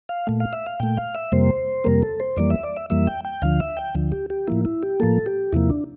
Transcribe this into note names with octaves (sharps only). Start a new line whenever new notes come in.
F5
A#2 A3
F5
E5
F5
A#2 A3 G5
F5
E5
F2 C3 G3 A#3 C5
F2 C3 G3 A#3 A#4
A4
C5
F2 E3 G3 A#3 D5
E5
D5
E5
F2 E3 G3 A#3 E5
G5
G5
D2 D3 F3 F5
E5
G5
D2 D3 F3
G4
G4
A2 F3 A#3 E4
E4
G4
A2 F3 A#3 A4
G4
E2 C3 F3 A#3 E4
D4